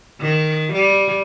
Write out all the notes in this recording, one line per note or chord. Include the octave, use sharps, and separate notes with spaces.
D#3
G3